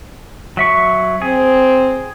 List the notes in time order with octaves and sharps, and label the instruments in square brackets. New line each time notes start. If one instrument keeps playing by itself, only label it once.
[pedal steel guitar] F#3 E5 C#6
[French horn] C4 [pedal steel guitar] G#4